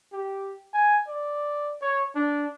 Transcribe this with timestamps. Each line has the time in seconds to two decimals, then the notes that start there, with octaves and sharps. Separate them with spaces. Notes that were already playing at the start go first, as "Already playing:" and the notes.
0.12 G4
0.74 G#5
1.07 D5
1.82 C#5
2.15 D4